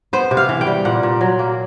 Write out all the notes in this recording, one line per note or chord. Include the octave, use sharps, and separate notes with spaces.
B3 C5
C3
F5
E3
G5
G3
A#2 F#5
A#2
F#3
A#3